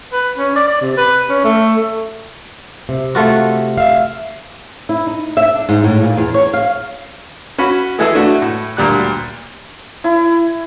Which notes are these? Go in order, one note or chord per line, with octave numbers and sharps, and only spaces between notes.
B4
C#4
D5
D5
C3
B4
C#4
A3
C3
A3 F4 F#4
E5 F5
E4
D#4
E5
D4
G#2
A2
A#2
E2
C#5
F5
C#4 F#4 B5
E3 G#3 E4 G#4 A4
A3 D4 E4 F#4
A2
D2 A#2 G3 F#6
E4